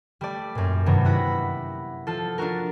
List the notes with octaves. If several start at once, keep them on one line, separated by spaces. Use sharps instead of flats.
G3 A3 D5
F#2 A#2
G2 C3 D#3 F#3 B3 F#4
G3 E4 F#5 B5 A#6
F3 F4 A4
D4 F4 F#4 A#4